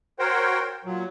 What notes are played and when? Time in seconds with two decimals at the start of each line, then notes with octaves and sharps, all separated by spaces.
0.19 F#4 A#4 C5 C#5 G5
0.85 A#2 F#3